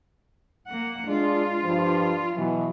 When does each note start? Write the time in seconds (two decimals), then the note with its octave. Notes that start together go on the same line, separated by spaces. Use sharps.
0.67 A#3 F#5
1.08 G#3 D4 F4
1.64 G2 F3
2.37 B2 E3 F#3